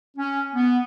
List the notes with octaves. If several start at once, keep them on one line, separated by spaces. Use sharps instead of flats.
C#4
B3